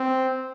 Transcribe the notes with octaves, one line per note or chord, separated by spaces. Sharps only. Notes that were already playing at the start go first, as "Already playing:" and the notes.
Already playing: C4